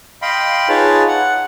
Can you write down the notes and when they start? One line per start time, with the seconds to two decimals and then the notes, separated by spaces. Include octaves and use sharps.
0.22 D#5 F5 G5 B5 C6
0.69 D#4 F4 G#4 B4 C#5 A5
1.08 F#5